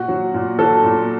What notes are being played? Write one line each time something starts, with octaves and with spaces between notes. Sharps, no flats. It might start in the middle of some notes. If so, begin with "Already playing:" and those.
Already playing: A#2 F#4
F#3
A#2
F#3 A4
A#2